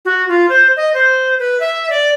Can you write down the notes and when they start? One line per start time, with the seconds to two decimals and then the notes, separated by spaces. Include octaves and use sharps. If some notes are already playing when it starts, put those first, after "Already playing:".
0.05 F#4
0.29 F4
0.50 C5
0.76 D#5
0.94 C5
1.39 B4
1.60 E5
1.90 D5